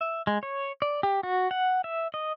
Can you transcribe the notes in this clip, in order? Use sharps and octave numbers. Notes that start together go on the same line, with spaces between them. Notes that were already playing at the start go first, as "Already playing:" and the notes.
E5
G#3
C#5
D5
G4
F#4
F#5
E5
D#5